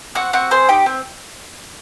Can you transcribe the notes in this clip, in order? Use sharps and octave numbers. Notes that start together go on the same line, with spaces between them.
C4 F#4 F#5
C4 F#4 F#5
G#4 C5 C6
D#4 G4 G5
C4